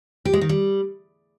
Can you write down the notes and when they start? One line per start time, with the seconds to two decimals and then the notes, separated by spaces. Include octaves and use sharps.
0.25 G4
0.33 G#3
0.41 D#3
0.49 G3